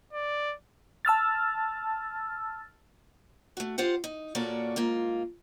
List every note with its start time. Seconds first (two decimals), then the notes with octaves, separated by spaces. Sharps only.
0.13 D5
1.05 A5 E6 F6 A6
3.57 A3 F#4
3.78 F4 G4 C5 F#5
4.04 D#4
4.35 A#2 A#3 C#4 F#4 A4 D5
4.76 G#2 A#3 F4